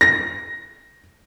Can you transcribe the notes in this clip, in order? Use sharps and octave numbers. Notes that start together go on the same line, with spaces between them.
A#6